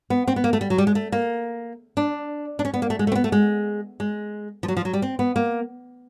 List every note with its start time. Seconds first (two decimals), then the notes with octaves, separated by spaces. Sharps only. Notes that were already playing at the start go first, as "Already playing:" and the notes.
0.10 B3
0.28 C4
0.36 B3
0.44 A#3
0.53 A3
0.61 G3
0.70 F#3
0.78 G3
0.87 G#3
0.95 A3
1.12 A#3
1.97 D4
2.59 D4
2.65 C#4
2.74 B3
2.82 A#3
2.90 A3
2.99 G#3
3.07 A3
3.12 C4
3.15 B3
3.24 A3
3.32 G#3
4.00 G#3
4.63 F3
4.68 F#3
4.77 F3
4.85 F#3
4.93 G3
5.02 C4
5.19 B3
5.36 A#3